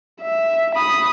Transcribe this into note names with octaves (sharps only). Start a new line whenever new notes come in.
E5
B5 D#6